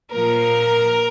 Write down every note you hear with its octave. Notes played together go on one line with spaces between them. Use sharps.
A#2 F3 A#4